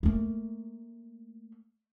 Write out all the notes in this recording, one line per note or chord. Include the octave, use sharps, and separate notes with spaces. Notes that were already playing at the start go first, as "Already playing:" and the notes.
A3 A#3